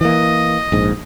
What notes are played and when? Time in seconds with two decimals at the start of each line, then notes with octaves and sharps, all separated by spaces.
0.01 E3 A#3 D#5
0.72 A#1 G#2